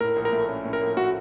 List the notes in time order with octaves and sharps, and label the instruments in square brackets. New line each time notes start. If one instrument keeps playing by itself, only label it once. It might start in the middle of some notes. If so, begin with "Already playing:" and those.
[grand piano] A2 [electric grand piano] A#4
[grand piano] A#1
[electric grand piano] A#4
[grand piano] A3
C#4
A2
[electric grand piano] A#4
[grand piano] A#1
[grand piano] A3 [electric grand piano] F#4